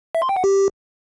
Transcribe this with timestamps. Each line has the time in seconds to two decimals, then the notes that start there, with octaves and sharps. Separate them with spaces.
0.15 E5
0.22 C6
0.29 G5
0.37 F#5
0.44 G4